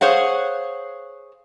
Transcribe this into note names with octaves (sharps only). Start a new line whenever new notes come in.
G#4 C5 C#5 F5 F#5